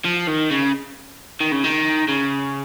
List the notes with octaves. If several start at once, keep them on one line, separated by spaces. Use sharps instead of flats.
F3
D#3
C#3
D#3
C#3
D#3
C#3